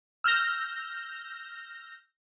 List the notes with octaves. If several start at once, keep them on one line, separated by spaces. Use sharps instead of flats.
E6 F6 G6 A#6